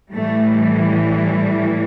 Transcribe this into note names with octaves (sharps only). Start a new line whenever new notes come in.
A2 E3 G3 A3